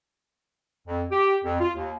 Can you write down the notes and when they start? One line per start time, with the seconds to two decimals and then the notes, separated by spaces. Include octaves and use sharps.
0.86 F2
1.11 G4
1.44 F2
1.60 F4
1.76 D#2